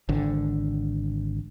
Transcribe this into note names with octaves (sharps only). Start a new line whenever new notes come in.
G#1 D3